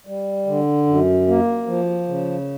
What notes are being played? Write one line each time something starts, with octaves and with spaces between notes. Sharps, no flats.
G3
D3
F#2
A#3
F3
C#3